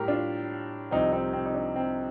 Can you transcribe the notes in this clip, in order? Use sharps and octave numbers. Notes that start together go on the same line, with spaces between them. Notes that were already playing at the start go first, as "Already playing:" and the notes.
Already playing: A2 G3 G4 A#4
D4 F4
C2 C3 F3 C4 D#4
C4 D#4
C4
D#4
D4
C4